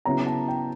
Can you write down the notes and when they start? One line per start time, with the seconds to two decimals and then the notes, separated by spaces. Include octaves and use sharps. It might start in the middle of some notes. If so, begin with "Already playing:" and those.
0.05 C#3 F#3 B3 E4 A#5
0.27 A5
0.48 G5